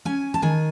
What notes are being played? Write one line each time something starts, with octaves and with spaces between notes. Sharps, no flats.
C#4 G#5
A5
D#3 G#5